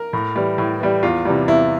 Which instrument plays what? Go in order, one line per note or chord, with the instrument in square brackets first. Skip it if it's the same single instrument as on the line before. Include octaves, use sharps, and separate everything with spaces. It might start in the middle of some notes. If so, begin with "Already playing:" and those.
Already playing: [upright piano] A#4
A2
E3 G3
A2
E3 G3
E2 F4
C3 E3 G3
E2 E4